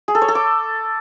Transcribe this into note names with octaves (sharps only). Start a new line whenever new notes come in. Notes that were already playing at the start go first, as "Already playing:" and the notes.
G#4
A4
C#5
A4
D6